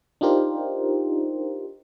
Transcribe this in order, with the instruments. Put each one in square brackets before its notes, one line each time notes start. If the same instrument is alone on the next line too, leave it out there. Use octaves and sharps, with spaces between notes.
[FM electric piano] D4 D#4 F4 G4 A#4 C5